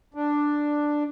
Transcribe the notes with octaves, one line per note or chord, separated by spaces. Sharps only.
D4